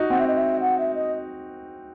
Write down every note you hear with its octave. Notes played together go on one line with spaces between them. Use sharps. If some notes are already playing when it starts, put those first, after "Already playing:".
Already playing: D#4 F#4
C4 F#5
E5
D#5
E5
F#5
E5
D#5